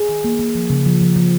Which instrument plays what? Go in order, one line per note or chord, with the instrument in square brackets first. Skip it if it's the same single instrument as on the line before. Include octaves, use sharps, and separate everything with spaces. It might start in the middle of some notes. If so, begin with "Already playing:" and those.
Already playing: [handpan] G#4
D#3
A#3
A#3
F3
C#3
F3
F3
F3